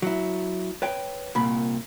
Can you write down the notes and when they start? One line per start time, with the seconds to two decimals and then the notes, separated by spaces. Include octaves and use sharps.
0.02 F#3 E4
0.82 B4 C#5 G5
1.35 C2 A#2 B5